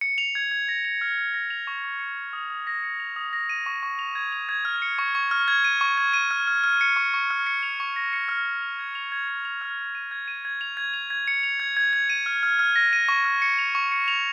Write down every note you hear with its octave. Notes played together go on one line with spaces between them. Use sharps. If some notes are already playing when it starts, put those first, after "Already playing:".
C#7
F7
G#6
G#6
A#6
F7
F6
F6
A#6
F7
C#6
C#6
C#7
F7
D#6
D#6
A#6
C#7
F7
D#6
A#6
D#7
C#6
C#6
F7
G#6
F7
G#6
F6
C#7
C#6
C#6
F6
G#6
D#7
C#6
G#6
D#7
F6
F6
F6
C#7
C#6
C#6
F6
C#7
F7
C#6
A#6
C#7
F6
F6
F7
G#6
F7
G#6
C#7
F7
F6
F6
D#7
G#6
D#7
G#6
F7
G#6
F7
G#6
C#7
F7
G#6
G#6
G#6
D#7
F6
F6
F6
A#6
D#7
C#6
F6
C#7
F7
C#6
C#7
F7